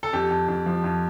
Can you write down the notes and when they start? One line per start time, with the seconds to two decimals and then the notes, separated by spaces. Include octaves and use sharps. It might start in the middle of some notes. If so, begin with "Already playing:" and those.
0.03 A4
0.13 F2 G4
0.31 F2
0.48 F2
0.66 F3
0.84 F2